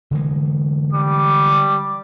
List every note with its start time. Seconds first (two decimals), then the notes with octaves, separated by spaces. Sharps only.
0.11 D3 E3 G#3
0.93 G3 D6